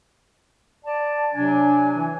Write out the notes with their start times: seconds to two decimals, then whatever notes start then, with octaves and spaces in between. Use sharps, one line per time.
0.85 D5 A5
1.34 C3 F#3 D4 G#5
1.97 E3